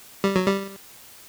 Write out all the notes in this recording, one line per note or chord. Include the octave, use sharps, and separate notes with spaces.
G3
F#3
G3